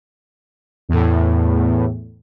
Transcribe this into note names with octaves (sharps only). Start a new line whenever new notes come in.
E2 A2